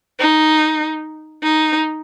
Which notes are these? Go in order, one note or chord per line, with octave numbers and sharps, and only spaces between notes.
D#4
D#4